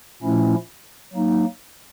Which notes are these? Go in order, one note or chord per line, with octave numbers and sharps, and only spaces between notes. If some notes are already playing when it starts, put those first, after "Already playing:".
A#2 F3 A3 C#4 E4
F#3 A#3 D#4